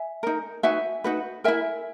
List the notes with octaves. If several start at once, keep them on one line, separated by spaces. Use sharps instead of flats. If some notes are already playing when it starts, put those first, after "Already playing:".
Already playing: E5 G#5
D#4 A#4
D#4 F#4 B4 E5 G#5
D#4 F#4 B4
E4 A#4 E5 G#5